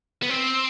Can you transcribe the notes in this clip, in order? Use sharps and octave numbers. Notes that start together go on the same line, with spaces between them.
B3
C4